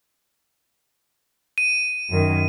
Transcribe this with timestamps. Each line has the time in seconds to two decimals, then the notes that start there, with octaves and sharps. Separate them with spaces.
1.58 D#7
2.10 F#2 D#3